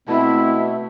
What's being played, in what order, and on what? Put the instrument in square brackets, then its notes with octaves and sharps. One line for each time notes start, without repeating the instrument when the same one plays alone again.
[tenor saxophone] B2 [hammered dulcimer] A3 [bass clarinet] C4 [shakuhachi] E4